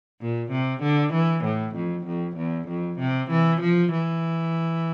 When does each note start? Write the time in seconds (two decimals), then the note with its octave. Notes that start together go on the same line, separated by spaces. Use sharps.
0.21 A#2
0.52 C3
0.83 D3
1.13 E3
1.45 A2
1.75 F2
2.06 F2
2.37 E2
2.68 F2
2.99 C3
3.31 E3
3.61 F3
3.92 E3